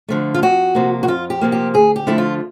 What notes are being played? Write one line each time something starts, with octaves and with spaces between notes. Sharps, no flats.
D3 F3 A3
F4
F2 F#4
C3 F3 A#3
F#4
F2 F4
G4
C3 F3 A#3
G4
D2 G#4
G4
D3 F3 A3 E4
F4